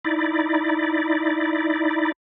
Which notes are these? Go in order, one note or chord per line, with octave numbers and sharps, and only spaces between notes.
D#4 E4 D5